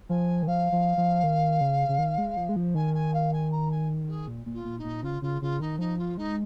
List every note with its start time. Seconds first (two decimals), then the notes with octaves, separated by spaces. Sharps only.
0.09 F3 G#5
0.43 D#3
0.47 F3 F5
0.72 F3
0.97 F3
1.24 D#3
1.61 C#3
1.89 C#3
1.99 D#3
2.18 G#3
2.37 F3
2.49 G#3
2.56 F3
2.75 D#3 G#5
2.94 G#5
3.13 F5
3.32 G#5
3.51 A#5
3.70 G#5
4.08 G#4
4.28 A#2
4.46 A#2
4.53 F4
4.65 A#2
4.78 D#4
4.84 A#2
5.03 C#3 F4
5.22 C#3 F4
5.41 C#3 F4
5.60 D#3 D#4
5.79 F3 D#4
5.98 F4
6.17 G#3 D#4